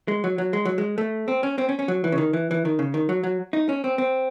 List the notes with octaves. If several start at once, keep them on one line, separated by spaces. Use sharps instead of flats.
G#3
F#3
F#3
G#3
F#3
G#3
A3
C4
C#4
C4
C#4
C#4
F#3
E3
C#3
D#3
E3
E3
D#3
C#3
D#3
F#3
F#3
D#4
C#4
C4
C4